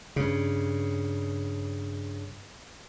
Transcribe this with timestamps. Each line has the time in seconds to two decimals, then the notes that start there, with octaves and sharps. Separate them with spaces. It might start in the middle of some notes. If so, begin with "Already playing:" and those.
0.16 G2 C#3